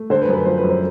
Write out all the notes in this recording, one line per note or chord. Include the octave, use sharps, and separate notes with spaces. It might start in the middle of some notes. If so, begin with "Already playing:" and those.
Already playing: A3
D3 C5
B4
F#2
B4
F3 C5
B4
F#2
C5